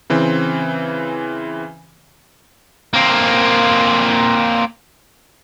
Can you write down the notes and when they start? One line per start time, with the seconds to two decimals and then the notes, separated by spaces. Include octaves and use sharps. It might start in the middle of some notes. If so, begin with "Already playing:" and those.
0.10 C#3 E3 C4
2.93 A#3 C4